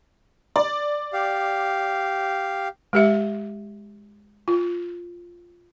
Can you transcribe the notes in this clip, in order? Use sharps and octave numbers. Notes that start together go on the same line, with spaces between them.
D5
G4 F5
G#3 G4 E5
F4